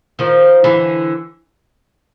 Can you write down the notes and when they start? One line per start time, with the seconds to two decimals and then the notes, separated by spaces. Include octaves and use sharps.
0.19 D#3 F3
0.64 D3 E3